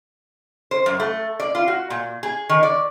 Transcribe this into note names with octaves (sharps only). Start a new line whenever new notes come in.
C5
F#2
A3
D5
F4
F#4
A#2
G#4
D#3
D5